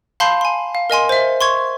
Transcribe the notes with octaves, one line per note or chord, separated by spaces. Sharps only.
F5 A5 B5 C6 G6 C7
G#5 C6
F5
A#4 D#5 G#5 C6
C5 E5
C6 C#6 G#6